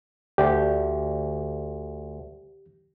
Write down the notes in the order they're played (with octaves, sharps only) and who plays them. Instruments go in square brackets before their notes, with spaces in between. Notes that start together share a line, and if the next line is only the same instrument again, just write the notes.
[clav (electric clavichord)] D2 [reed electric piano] G4